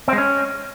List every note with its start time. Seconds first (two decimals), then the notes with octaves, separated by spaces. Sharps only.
0.08 C4
0.13 G#3
0.18 C#4